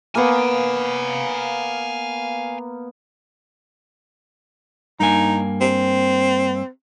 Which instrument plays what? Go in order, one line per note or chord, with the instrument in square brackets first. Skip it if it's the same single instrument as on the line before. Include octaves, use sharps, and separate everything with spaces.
[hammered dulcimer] A#3 B3 [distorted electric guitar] F5 G#5
[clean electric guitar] G2 A#3 G#5 [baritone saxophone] D#4
[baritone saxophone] C4